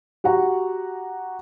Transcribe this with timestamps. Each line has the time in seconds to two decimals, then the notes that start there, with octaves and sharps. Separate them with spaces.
0.24 F#4 G4 F#5 A#5 C#6